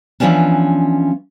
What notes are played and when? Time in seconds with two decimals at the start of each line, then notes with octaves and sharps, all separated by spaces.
0.20 E3 F3 G#3 B3 C#4 D4